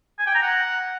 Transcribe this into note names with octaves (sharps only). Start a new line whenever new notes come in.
G#5
G5
A#5
F#5